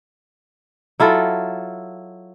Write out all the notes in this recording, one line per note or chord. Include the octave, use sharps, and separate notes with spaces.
F#3 E4 F4 A4